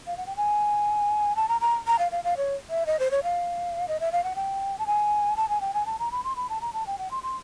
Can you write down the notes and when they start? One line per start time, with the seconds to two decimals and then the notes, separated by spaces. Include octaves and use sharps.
0.07 F5
0.17 F#5
0.27 G5
0.37 G#5
1.36 A5
1.49 A#5
1.61 A#5
1.87 A#5
1.99 F5
2.12 F5
2.24 F5
2.37 C#5
2.70 E5
2.87 D#5
2.99 C5
3.11 C#5
3.23 F5
3.88 D#5
4.00 E5
4.12 F5
4.24 F#5
4.36 G5
4.79 A5
4.87 G#5
5.37 A5
5.49 G#5
5.61 G5
5.74 G#5
5.86 A5
5.99 A#5
6.11 B5
6.24 C6
6.36 B5
6.49 A5
6.61 A#5
6.73 A5
6.87 G5
6.98 F#5
7.11 C6
7.23 C6